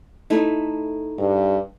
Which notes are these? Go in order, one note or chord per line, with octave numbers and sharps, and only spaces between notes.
A3 D#4 E4
G2